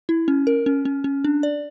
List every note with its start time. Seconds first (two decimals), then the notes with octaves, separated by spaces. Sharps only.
0.09 E4
0.28 C#4
0.47 A#4
0.66 C#4
0.85 C#4
1.04 C#4
1.24 D4
1.43 D5